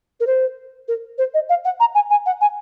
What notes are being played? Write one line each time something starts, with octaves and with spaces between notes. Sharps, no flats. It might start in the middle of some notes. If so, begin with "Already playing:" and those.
A#4
C5
A#4
C5
D#5
F5
F#5
A#5
G#5
G#5
F#5
G#5